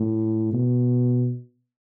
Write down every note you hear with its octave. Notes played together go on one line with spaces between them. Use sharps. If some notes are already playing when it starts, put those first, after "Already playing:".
Already playing: A2
B2